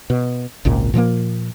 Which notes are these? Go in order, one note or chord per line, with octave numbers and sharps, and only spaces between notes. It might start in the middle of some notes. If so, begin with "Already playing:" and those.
B2
G#1 C#2 A#2
A#2 F3 G#3 A#3